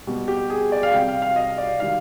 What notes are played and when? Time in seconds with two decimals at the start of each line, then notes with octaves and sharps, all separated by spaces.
0.07 B2 G3
0.28 G4
0.50 G#4
0.72 D5
0.83 F5
0.93 C3 G3 G5
1.08 F5
1.22 F5
1.36 D#5
1.58 D5
1.80 D#3 G3 F5